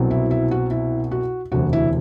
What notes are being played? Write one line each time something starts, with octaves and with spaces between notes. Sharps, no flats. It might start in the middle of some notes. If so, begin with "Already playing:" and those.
Already playing: C2 B2 F#3 C4
E4
E4
F#4
E4
F#4
E1 D2 C3 F#4
E4